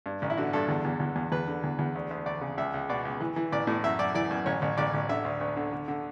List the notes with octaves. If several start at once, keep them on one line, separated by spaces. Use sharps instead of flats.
G2
A1
E4
D3 F#4
G2 A4
E2
E2
E2
E2
E2 B4
D3
E2
E2
D2
D2
D2 D5
C#3
C#2 E5
C#2
B2 D5
C#2
E3
E3
A1 D5
A2
F#2 E5
F#2 D5
E3 D5
F#2
A1 C#5
A1
A1 D5
A1
D3 E5
D2
D2
D3
D3
D3